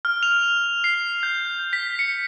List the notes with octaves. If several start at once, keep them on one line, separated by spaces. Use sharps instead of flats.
F6
F7
C7
G6
B6
C#7